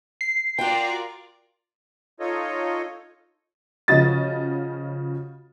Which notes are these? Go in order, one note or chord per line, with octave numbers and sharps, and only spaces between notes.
C7
F4 F#4 A#4 D5 G5
D#4 F4 A4 C#5 D#5
C#3 F3 F#4 D#5 A6